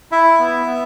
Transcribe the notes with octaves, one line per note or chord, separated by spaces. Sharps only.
E4 E5
B3
B3